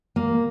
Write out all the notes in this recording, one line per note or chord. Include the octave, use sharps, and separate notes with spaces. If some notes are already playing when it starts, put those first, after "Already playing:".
A#3